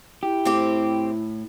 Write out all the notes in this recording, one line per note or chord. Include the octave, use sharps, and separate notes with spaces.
E4 G4
A2 C4 G4